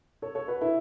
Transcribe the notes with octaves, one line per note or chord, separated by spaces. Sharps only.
A4 C#5
A4 C#5
F#4 B4
E4 A4